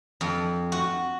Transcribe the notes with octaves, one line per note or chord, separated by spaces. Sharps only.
F2
F#4